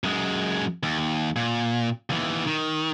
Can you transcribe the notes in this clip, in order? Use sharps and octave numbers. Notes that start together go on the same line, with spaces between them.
F#2 G#3
D#2
A#2
D#2 E3
D#3